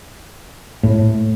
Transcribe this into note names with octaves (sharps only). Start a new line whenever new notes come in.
A2